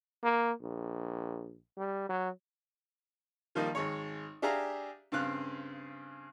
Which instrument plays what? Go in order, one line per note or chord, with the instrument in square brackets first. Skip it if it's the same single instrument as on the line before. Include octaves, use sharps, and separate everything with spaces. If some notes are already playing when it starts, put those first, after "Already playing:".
[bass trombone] A#3
A#1
G3
F#3
[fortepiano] D#3 F3 G3 A#3 D#4
G#1 G#3 C#5
D4 G4 G#4 E5 F5 A#5
G2 C#3 C4 F5 F#6